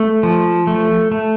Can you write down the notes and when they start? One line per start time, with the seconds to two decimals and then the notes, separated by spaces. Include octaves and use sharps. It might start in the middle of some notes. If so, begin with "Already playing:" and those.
Already playing: A3
0.23 F3
0.67 A3
1.12 A3